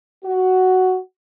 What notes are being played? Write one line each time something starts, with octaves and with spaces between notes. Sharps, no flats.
F#4